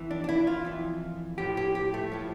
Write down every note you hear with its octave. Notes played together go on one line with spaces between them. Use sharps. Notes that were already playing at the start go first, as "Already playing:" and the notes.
Already playing: F2 E3
D4
D4
E4
F4
F2 E3
A2 F3 G4
G4
G4
A3
A2 F3